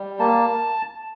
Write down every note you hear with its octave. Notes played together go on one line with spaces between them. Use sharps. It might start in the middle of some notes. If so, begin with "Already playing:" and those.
Already playing: G3
A#3 A5